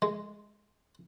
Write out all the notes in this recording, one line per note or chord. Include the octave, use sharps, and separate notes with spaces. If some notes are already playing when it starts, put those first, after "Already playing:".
G#3